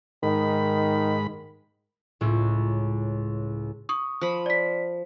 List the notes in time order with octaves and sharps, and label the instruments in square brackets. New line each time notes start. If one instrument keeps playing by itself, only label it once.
[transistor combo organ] G#2 B5 [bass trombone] D#3
[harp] C#2 A2
[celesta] C#6 D#6
[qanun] F3 B5
[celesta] D5 B6